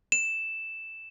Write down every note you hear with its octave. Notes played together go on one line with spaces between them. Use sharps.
E7